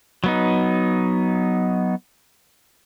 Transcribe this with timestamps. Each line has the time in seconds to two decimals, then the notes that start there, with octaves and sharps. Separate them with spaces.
0.24 F#3 B3 D#4